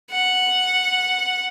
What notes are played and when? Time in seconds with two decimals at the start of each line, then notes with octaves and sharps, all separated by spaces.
0.11 F#5